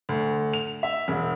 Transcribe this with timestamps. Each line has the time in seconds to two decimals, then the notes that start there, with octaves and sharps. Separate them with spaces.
0.09 D2
0.54 F7
0.83 E5
1.08 E1